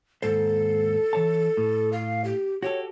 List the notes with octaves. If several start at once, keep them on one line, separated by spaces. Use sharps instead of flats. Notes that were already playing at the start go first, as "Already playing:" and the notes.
D#2 G#2 A4 C5
E3 C#5 A5
A2
F5
G4
F#4 G4 A4 C#5